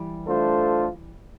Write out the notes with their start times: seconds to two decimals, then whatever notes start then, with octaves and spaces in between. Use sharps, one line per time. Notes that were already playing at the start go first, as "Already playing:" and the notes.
Already playing: E3 G3
0.27 A3 D4 F4 A4 C5